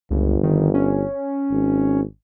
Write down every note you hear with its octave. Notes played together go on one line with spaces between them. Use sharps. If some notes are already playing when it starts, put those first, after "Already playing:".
G1 C#2
D#3
C#4
G#1